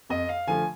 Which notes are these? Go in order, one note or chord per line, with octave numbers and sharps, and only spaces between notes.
F2 D#5
F5
D3 F3 A3 G#5